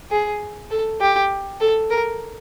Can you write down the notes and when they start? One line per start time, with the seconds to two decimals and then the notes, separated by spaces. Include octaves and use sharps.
0.11 G#4
0.71 A4
1.01 G4
1.61 A4
1.90 A#4